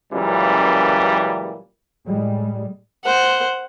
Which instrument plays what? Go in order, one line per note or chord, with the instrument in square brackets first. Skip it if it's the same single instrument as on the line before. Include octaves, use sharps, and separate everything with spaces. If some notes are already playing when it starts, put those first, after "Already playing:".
[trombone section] C#2 F#2 A#2 E3 G3
[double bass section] A2 G3 G#3
[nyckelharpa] C5 F#5